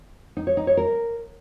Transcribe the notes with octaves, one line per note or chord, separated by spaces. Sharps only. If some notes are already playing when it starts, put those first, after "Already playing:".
D#4
C#5
D#4
C#5
A#4